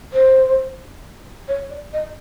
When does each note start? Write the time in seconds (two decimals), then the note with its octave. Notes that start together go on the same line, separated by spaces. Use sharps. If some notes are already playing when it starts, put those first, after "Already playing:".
0.13 C5
1.48 C#5
1.70 D5
1.93 D#5